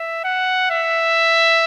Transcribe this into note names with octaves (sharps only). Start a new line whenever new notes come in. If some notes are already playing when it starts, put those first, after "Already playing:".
Already playing: E5
F#5
E5